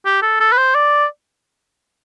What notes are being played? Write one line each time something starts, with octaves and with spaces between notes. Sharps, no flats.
G4
A4
A4
B4
C5
D5